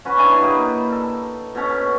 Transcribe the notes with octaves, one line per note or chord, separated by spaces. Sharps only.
C#4 F#4 B4
D4 E4 G#5
G3 A#3 D#4
A4
B2 C#4